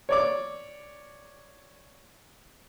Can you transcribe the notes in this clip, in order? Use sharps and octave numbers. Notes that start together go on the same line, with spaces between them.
C#5 D5 D6